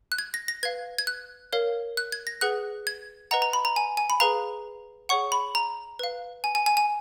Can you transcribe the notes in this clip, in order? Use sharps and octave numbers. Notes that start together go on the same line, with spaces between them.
F#6
G#6
A#6
A#6
B4 F5 G#6
G#6
F#6
A#4 C#5 F5
F#6
G#6
A#6
G#4 B4 F#5 F#6
G#6
B4 D#5 F#5 A#5
A#5
B5
A#5
G#5
G#5
B5
G#4 B4 F5 A#5
G#4 C#5 F#5 C#6
B5
A#5
B4 F5
G#5
G#5
G#5
G#5